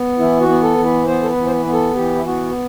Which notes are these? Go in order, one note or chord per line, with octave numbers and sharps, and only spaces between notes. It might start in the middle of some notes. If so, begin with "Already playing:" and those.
Already playing: B3
E3 E4
F#4
B3
A4
E3
B4
B3 C5
A4
B4
E3
C5
B4
B3
A4
E3 G4
E4
B3 F#4